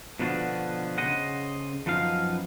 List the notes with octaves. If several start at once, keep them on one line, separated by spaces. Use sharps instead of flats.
B2 D3 F3 B3 D4 F#4
C#3 C5 D#5 F#5
F#2 F3 B3 D#4 F5